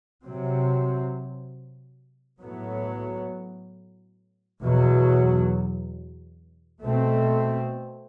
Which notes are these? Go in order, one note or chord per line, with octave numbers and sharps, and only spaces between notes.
C3 F#3 C4
A2 F#3 B3
E2 B2 F#3
B2 A3 C4